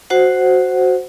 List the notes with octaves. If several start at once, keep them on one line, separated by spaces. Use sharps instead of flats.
F#4 C5 F#5